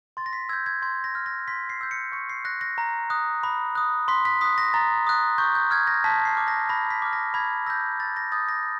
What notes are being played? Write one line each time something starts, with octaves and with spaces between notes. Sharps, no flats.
C6 A6
A#6
B6
E6 G6 G#6
G#6
C6 G#6
A#6
F6
A#6
C6 B6
C7
E6 G6
C#7
C#6 C#7
C7
F#6 A#6
A#6
A#5
D#6 F#6
B5
D#6 F#6
C6 B6
B6
D#6 F#6 B6
A#6
A#5 A6
D#6 F#6
C#6 G6
G6
F6 G#6
A#6
A5 B6
C7
D6 F6
A#6
B5 A#6
B6
D6 F6
A#6
B5 G#6
E6 G6 A#6
B5 A6
A#6
D#6 G6 A6
A#6